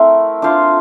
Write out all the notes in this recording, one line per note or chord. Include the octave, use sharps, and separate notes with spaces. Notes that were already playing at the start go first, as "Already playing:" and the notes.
Already playing: A3 C4 E4 A#4
D4 F4 C5 F5